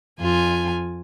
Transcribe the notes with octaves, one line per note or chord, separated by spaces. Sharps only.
F2 F4 G#5